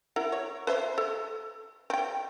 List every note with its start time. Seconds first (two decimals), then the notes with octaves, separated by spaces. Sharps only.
0.16 E4 A#4 F#5
0.32 C#5
0.67 B4 C5 E5
0.98 A4
1.90 C4 G5